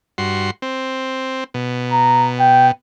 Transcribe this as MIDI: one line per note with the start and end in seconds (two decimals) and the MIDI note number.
0.18 0.51 43
0.18 0.51 66
0.18 0.51 84
0.62 1.44 60
1.54 2.72 47
1.92 2.28 82
2.40 2.69 79